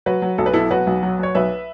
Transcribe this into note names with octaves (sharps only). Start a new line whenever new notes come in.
F#3 F#4 B4
F#3
B1 A4
B4
B2 E4 A4
F#3 F#4 B4
B1
F#3
F#3 C#5
B1 B4 E5